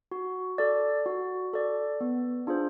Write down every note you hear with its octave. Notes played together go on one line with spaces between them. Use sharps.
F#4
A4 D5
F#4
A4 D5
B3
D4 F4 G#4 C5